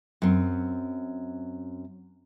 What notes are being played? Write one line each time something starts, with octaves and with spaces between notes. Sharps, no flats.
F#2 C4